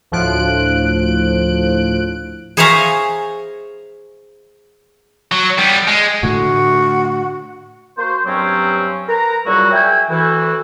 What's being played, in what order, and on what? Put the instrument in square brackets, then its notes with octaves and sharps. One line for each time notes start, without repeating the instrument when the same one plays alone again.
[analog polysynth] D2 A2 F3 F#6 D7
[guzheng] G#4 C5 C#5 E5 F5 A#5
[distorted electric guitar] F#3
G3 B3
G#3
[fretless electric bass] A2 D3 A3 [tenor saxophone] F#4
[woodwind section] A#3 F#4 C5
G2 F#3 C4 C#4
A#4 B4 A#5
A#2 C#3 F#3 G3 E4 F#4
G#4 E5 G5 G#5
D2 E3 E4 F#4